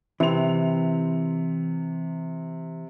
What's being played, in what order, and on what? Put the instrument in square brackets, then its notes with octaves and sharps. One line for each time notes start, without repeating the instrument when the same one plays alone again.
[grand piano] C3 F7 [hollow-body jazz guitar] E3 C4